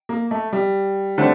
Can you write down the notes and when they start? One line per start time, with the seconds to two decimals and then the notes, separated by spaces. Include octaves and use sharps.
0.09 A#3
0.31 A3
0.53 G3
1.17 D3 A3 C4